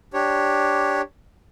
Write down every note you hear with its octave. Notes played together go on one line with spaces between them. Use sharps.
D4 G4 C#5